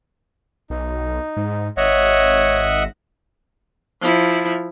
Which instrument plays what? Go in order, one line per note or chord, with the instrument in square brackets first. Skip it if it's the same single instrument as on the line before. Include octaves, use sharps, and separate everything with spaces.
[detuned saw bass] B1 [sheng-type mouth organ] D#4
[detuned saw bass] G#2
[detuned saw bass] G#1 [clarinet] C#5 [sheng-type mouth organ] D#5 E5 F#5
[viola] F3 E4